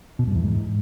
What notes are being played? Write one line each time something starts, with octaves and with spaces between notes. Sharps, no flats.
B2
G2
E2
G#2